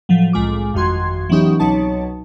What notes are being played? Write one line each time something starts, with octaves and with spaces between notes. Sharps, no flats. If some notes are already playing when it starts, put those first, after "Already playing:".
A2 F3 F#3
C2 A2 G#3 F4 D6
G1 F2 D#3 F#4 C6 G#6
E3 F#3 B3 C#4 D#4 G4
C2 B2 F#3 D#4 C#5 A5